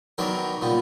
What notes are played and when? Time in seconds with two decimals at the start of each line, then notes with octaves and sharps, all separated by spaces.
0.18 D#3 F#3 B3 D4 A#4
0.62 A#2 G3 B3